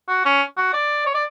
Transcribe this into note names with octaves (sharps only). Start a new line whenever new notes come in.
F#4
C#4
F#4
D5
C#5
D5